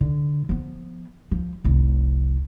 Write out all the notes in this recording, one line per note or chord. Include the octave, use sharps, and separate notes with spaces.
D3
F3 B3
F3
F1 C2